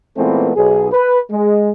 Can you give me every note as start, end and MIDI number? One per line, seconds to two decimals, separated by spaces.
0.17 0.50 46
0.17 0.50 52
0.17 0.50 56
0.17 0.50 57
0.17 0.50 59
0.17 0.50 60
0.55 0.88 35
0.55 0.88 68
0.92 1.18 71
1.30 1.71 56